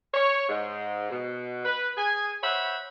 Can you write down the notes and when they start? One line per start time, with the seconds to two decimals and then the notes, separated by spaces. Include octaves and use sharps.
0.14 C#5
0.49 G#2
1.11 B2
1.65 B4
1.97 G#4 G#5
2.42 C5 C#5 E5 F#5 B5